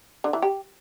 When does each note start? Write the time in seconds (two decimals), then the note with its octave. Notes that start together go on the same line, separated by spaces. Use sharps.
0.24 D3
0.33 E3
0.42 G4